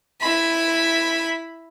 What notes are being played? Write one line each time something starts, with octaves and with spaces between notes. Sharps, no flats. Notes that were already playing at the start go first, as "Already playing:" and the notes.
E4 B5